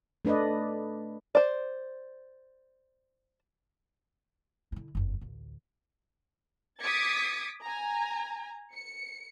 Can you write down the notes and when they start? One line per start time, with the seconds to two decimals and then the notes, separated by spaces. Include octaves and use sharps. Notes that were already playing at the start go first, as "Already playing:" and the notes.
0.25 A3 D4 B4 D5 D#5
1.35 C5 D5
4.72 D3 E4
4.95 F#1 F2
5.21 A1 D2
6.82 D6 D#6 G#6 A6 B6 C#7
7.63 G#5 A#5
8.74 C#7